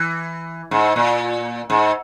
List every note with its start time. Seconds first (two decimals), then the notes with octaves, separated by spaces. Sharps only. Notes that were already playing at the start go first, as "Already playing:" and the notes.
Already playing: E3
0.71 G#2
0.96 A#2
1.70 G#2